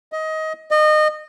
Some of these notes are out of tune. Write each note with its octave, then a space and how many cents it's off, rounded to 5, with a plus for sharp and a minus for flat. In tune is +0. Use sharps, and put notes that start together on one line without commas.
D#5 +20
D#5 -25